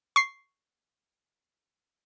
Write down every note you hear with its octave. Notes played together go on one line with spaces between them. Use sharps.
C#6 C7